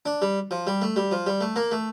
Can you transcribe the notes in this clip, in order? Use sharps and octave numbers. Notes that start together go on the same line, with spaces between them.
D4
G3
F3
G3
A3
G3
F3
G3
A3
A#3
A3